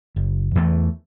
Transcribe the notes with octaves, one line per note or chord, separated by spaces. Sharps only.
F#1
E2 E3 A3